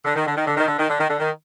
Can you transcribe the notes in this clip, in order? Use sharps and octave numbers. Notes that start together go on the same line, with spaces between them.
D3
D#3
D3
D#3
D3
D#3
D3
D#3
D3
D#3
D3
D#3